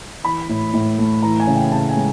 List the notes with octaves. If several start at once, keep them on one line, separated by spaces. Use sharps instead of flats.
E3 B5
A2
A2
A3
E3 A#5
G#5
C#3
G5
C#3 A5
G#5
G#3